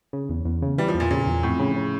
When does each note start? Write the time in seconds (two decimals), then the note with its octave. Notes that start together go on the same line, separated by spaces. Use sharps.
0.13 C#3
0.29 E2
0.45 E2
0.62 C#3
0.78 E3 G3
0.88 F3
0.94 E2
1.00 A#2
1.11 A#2 C#3
1.27 E2
1.43 F2 A2
1.60 C#3
1.76 C#3